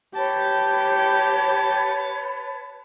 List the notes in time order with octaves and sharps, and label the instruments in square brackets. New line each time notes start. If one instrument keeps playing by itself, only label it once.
[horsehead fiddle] G4 [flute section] B4 C#5 [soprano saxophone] A5